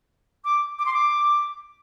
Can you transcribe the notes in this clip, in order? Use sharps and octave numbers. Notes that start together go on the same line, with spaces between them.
D6
D6
C6
D6